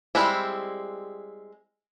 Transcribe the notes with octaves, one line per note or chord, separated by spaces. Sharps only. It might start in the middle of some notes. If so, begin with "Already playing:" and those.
G3 G#3 C4 E4